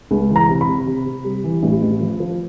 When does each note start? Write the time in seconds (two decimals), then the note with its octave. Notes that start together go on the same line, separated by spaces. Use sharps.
0.11 C#2
0.30 E3
0.36 A#5
0.49 C3
0.61 B5
0.68 C3
0.87 C3
1.05 C3
1.24 G3
1.44 E3
1.63 A1
1.82 A1
2.01 F3
2.20 F3